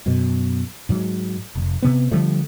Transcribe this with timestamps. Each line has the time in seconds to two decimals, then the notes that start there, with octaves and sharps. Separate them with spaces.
0.06 F#2 B2
0.89 G#2 F#3
1.55 F1
1.82 C3 B3
2.11 D3 F3 G3 A3